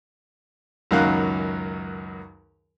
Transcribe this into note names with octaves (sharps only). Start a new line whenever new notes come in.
C#2 F#2 D#3 F#3 F5 F#6